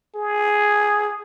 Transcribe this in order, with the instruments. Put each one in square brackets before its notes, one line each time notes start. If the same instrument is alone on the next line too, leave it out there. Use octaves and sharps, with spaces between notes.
[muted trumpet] G#4